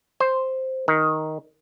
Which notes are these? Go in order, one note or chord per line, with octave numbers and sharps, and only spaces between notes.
C5
D#3